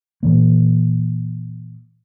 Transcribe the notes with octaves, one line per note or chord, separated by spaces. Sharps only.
A#2 E3 A#3